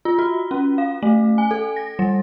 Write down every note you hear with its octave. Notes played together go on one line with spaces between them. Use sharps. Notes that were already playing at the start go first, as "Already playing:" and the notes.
F4
F#4
C#4
F5
A3
G#5
A4
A#6
G3